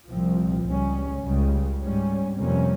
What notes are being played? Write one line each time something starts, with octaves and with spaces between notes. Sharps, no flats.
C2 A#2 F3 C4
C#2 C#3 G3 C#4
C#2 C#3 G3
G#2 G3 C#4
F2 C3 G3 A#3 C#4